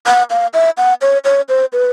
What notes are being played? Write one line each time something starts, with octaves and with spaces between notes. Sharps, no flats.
F#5
F5
E5
F#5
C#5
C#5
C5
B4